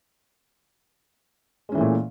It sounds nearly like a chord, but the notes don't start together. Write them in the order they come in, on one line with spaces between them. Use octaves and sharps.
G#3 C#4 E3 A3 A#2